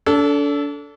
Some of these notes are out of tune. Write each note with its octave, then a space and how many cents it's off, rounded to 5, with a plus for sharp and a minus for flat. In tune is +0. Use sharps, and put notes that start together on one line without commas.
D4 -35 A4 +0